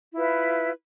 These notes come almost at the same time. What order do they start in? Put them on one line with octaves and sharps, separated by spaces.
E4 F4 B4 E5